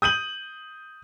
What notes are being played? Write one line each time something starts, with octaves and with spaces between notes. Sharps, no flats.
D#6 G6 D#7 F#7